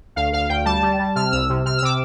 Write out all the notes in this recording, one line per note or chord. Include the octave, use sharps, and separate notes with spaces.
D2 F5
D2 F5
D2 G5
G3 A5
G3
G3
C3 F6
C2 E6
C3
C3 F6
E6
C3 D6